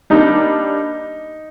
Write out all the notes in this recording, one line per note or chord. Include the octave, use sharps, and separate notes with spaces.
G3 A#3 D4 D#4